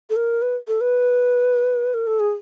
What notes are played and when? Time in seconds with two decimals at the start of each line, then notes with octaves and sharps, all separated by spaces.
0.10 A4
0.16 A#4
0.42 B4
0.68 A4
0.81 B4
1.94 A#4
2.07 A4
2.20 G#4